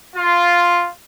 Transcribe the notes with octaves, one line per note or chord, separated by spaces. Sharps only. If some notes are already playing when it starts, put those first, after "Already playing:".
F4